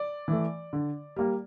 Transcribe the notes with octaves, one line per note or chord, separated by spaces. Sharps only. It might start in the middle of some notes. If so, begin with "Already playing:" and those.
Already playing: D5
E3 A3
D3
G3 A#3